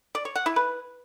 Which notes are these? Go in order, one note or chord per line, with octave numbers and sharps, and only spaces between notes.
D5
C#5
F#5
E4
B4